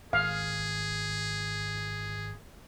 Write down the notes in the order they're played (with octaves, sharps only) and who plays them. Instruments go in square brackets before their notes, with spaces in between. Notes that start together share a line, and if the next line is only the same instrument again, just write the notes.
[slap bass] G#1 [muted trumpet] G#4 [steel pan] F5